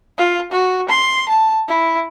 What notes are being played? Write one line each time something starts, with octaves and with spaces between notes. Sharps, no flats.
F4
F#4
C6
A5
E4